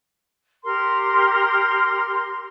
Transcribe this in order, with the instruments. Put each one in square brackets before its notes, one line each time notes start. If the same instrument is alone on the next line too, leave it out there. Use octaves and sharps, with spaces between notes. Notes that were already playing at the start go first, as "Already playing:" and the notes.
[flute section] G4 A#4 C6